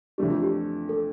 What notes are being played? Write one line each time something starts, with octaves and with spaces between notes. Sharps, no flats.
F2 E3 A3 D4 G4
F4
G4
A4